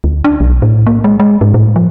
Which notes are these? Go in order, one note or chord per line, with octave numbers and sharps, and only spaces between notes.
D2
D4
B1
A2
A#3
G#3
G#3
G#2
A2
F3